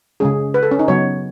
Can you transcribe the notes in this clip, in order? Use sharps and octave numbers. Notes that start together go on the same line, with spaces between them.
C#3 G#3 C#4 G#4
B4
A4
C#4
D#4
C#3 F#3 B3 C#5